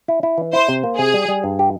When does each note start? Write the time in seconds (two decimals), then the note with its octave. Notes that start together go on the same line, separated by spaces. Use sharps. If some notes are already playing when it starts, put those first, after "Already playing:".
0.08 E4
0.23 E4
0.38 E3
0.53 E4 C5
0.69 C3
0.84 A#3
0.98 C3 G#4
1.14 G3
1.28 G3
1.44 G2
1.59 G4